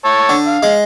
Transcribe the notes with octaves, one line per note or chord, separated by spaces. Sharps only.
C#5 A5 E6
D3
F5
G#3